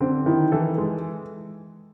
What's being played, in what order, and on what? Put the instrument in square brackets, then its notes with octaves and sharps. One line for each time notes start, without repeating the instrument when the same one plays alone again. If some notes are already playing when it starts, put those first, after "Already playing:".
[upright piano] D3 [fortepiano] C4
[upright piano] D#3 [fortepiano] E4
[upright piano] E3 [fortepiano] A4
[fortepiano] G#3